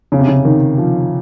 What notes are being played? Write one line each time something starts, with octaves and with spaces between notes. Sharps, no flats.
C#3
C3
C#3
D#3
F3